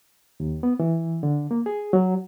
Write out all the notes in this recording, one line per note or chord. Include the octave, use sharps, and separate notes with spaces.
D#2
B3
E3
D3
A#3
G#4
F#3